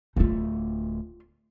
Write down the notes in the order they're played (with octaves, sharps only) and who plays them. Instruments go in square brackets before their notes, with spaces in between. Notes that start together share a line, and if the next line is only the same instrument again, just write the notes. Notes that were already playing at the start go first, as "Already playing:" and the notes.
[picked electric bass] D1 A3 [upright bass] D#4 F4